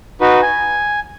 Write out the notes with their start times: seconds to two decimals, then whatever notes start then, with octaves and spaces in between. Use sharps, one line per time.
0.21 D#4 F#4 B4
0.42 G#5